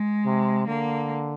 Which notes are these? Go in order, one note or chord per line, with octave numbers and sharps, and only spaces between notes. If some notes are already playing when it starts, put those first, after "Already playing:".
Already playing: G#3
C3
D3 A#3